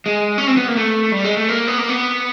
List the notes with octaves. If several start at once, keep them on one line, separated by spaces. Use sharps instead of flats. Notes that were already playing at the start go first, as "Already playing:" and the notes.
G#3
C#4
C4
B3
A#3
A3
G3
G#3
A3
A#3
B3
A#3
B3